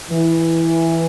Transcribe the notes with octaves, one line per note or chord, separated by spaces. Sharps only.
E3